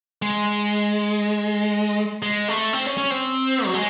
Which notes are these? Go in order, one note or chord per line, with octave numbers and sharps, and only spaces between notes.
G#3
G#3
A3
C4
C#4
C#4
C4
F#3
G#3